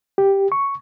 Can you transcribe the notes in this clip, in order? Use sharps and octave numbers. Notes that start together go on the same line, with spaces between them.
G4
C#6